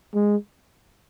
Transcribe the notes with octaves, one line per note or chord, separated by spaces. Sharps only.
G#3